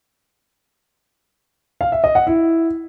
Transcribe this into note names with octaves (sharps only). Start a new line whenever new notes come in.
F5
E5
D#5
F#5
E4